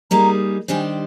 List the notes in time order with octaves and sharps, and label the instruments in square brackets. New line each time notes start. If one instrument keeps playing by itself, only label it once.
[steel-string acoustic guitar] G3 A#3 D#4 G#4 [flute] A#5
[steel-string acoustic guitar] D#3 G3 D4 G4 C5 [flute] G#5